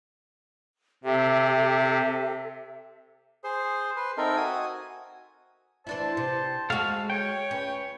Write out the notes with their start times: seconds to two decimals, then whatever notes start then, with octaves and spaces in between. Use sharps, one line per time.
1.04 C3 G4 A4 E5
3.44 G#4 C5 C6
3.96 B4 C6
4.18 C4 D#4 A4 A#4 E5
4.37 F#4 G#5 D#6
5.87 E3 D4 E4 C5 A5
6.17 C3
6.70 G#3 F#4 A4 F5
7.10 C#5 G5
7.51 C#2 C#4 F4 B4